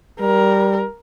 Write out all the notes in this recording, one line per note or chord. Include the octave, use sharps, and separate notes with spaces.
G3 A#4